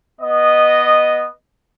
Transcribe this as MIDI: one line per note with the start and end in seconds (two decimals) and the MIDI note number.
0.20 1.29 59
0.20 1.29 75